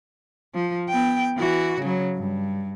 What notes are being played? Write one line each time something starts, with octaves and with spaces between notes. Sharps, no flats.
F3
B3 G5
E3 F#4
C#3 F#3
G2